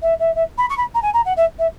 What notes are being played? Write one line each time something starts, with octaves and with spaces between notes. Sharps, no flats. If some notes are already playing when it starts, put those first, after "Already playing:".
E5
E5
E5
B5
C#6
B5
A#5
G#5
A#5
F#5
E5
E5